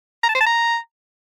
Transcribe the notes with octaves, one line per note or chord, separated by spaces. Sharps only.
A#5
A5
C5
A5
A#5